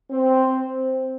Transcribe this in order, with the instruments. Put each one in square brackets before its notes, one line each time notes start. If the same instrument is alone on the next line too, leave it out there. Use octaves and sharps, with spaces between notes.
[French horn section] C4